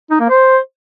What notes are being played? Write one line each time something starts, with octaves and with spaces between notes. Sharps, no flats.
D#4
A#3
C5